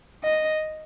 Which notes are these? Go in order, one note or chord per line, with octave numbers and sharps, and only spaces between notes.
D#5